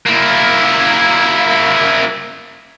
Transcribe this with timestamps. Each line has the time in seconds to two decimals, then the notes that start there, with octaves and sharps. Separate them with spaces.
0.06 A#3 E4